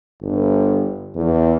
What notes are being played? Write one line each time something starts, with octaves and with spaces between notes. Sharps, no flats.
G1
E2